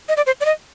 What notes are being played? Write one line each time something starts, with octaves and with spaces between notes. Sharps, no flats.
D#5
D5
C5
D5
D#5